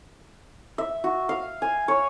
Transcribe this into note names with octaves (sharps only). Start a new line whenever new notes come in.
E5
F#4
F5
G#5
C#5